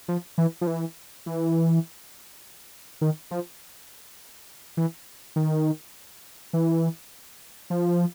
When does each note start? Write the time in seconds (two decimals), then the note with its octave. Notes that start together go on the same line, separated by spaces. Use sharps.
0.08 F3
0.38 E3
0.61 F3
0.67 E3
1.26 E3
3.01 D#3
3.31 F3
4.77 E3
5.36 D#3
6.53 E3
7.70 F3